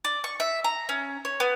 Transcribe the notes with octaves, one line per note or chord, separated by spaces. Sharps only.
D5
C#6
E5
A#5
C#4
C#5
B3